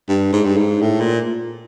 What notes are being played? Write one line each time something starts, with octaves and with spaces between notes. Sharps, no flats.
G2
G#2
G2
G#2
A2
A#2